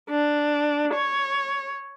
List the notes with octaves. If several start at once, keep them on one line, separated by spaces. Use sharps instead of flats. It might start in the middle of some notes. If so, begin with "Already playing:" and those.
D4
C#5